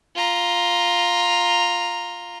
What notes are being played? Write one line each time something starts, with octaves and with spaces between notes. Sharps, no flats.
F4 A#5